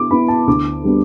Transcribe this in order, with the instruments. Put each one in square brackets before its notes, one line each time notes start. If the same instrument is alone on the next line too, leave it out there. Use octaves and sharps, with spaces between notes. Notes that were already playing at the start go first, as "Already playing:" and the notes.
Already playing: [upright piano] D3 B3 E4 D6
B3 E4 B5
A5
D2 D6
D3 G3 B3 D4